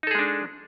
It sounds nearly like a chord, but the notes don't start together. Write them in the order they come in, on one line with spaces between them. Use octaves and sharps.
D#4 A4 G#4 G#3 D4